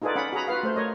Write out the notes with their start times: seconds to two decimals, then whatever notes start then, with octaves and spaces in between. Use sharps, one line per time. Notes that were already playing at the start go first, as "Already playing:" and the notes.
0.02 D#4 F4 G#4 A4 B4 D5
0.15 C#4 F#5 B5
0.33 F#4 G#4 A#5 B5
0.48 F4 F#4 B4 F5
0.63 A3 C5
0.76 A#4 C#5 D#5